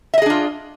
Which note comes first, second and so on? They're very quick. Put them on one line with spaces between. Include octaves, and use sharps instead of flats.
E5 D#5 G#4 D4 F4